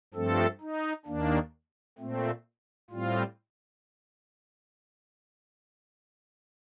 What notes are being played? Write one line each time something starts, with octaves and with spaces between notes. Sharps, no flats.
G2 F3 A3 C4 A4
D#4
D#2 D#3 A#3 D4
A#2 A3 C4
A2 G3 C4 F4